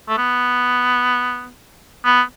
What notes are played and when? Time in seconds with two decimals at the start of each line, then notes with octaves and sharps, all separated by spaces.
0.09 A3
0.18 B3
2.05 B3